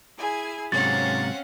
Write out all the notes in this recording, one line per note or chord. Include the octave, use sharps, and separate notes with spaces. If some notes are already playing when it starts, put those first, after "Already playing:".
E4 G#4 G#5
G#2 C3 F#3 C4 C#4 F5 F#5 A6